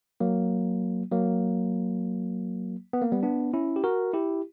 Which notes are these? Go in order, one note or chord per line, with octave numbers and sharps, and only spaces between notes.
F#3 A#3
F#3 A#3
B3
A#3
G3 B3
B3 D4
C#4 E4
G4
F#4 A#4
E4 G4